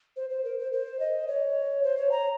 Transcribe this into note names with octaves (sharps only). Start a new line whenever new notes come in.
C5
C5
A#4
C5
C5
D#5
C#5
C5
C#5
A#5